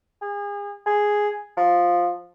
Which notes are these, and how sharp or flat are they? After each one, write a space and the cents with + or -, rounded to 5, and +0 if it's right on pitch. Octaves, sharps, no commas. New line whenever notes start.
G#4 -35
G#4 +0
F3 +10